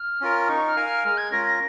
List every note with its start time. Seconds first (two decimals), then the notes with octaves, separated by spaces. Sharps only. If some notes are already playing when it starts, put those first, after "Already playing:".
Already playing: F6
0.21 C#4 F4 A#4
0.48 D#4 C#6
0.67 F6
0.76 A#4 F5 G#5
0.86 F6
1.04 G#3 F6
1.18 G#6
1.31 C#4 F4 A#4 A#6
1.45 A#6